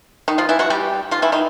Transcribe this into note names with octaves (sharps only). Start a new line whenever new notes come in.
D#3 D#4
F3 F4
E3 E4
F#3 F#4
G3 G4
F3 F4
E3 E4
D#3 D#4